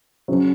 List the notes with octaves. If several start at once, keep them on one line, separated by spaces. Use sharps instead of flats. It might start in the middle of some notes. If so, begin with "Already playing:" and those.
C#3 F#3